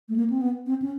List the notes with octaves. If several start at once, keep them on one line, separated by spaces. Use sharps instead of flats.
A3
A#3
C4
B3
C4
C#4